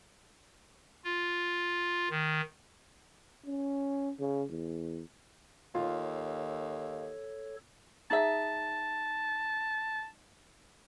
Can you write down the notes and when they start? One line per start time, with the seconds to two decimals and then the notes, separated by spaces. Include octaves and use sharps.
1.04 F4
2.10 D#3
3.46 C#4
4.20 C#3
4.50 E2
5.75 D#2 F4 A4 C#5
8.11 D#4 G#4 E5 A5